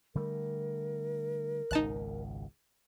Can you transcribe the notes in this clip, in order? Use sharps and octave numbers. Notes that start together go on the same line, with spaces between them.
D3 G3 A3 A#4
G#1 C#2 B2 D#4 A5 F#6